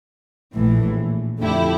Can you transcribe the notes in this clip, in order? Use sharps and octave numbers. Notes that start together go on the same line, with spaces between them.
A#1 A2 E3
F2 D3 A3 E4 G4